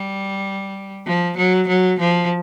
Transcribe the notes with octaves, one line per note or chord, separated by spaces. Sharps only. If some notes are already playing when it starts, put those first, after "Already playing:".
Already playing: G3
F3
F#3
F#3
F3